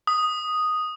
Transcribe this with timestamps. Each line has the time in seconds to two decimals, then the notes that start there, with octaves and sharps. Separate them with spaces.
0.07 D#6